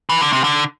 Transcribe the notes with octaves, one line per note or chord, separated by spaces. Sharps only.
E3
D3
C3
D3